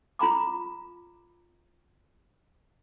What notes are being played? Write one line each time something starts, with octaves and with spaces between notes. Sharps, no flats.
F4 A#5 B5 D6